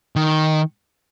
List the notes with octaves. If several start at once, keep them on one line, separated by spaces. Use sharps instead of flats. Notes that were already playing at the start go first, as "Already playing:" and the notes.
D#3